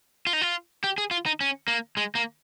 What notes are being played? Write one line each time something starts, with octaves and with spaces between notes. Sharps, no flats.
F4
D#4
F4
G4
G#4
F4
D#4
C#4
A#3
G#3
A#3